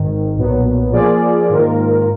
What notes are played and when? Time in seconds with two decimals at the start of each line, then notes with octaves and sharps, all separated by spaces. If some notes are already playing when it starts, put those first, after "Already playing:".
Already playing: G#1 G#2 D#3
0.37 B1 A#2 F#3 B3
0.93 F3 A#3 F4 G#4 D5
1.49 G#2 D#3 A#3 F4 A#4